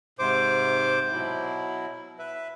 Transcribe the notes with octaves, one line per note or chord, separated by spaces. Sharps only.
G#2 C3 C5 D6
B2 F#3 E4
B4 E5